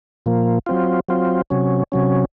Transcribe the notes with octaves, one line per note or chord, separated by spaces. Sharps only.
A#2 F3 A#3
F#3 C4 F4
F#3 C4 F4
C3 F#3 C#4
C3 F#3 C#4